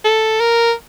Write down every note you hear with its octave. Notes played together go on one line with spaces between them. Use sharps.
A4
A#4